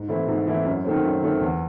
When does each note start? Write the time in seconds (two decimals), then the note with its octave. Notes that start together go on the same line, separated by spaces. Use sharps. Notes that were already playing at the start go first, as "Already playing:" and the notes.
Already playing: G#2
0.08 E3 A3 C4 E4
0.28 G#2
0.47 E3 A3 C4 E4
0.66 F#2
0.85 D#3 A3 C4
1.04 F#2
1.22 D#3 A3 C4
1.41 E2